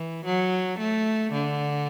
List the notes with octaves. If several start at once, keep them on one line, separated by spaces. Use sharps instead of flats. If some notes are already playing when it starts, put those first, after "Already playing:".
Already playing: E3
F#3
A3
D3